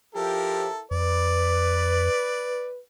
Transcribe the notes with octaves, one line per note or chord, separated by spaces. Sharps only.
F3 E4 G4 A4 A#4
F2 B4 D5